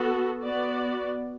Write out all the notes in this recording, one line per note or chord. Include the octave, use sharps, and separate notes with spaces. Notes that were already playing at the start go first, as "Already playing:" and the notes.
Already playing: B3 F#4 A4
B3 F#4 D5